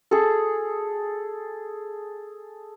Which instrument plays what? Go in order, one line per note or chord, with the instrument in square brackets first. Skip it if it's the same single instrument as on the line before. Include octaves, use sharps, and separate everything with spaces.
[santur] G#4 A4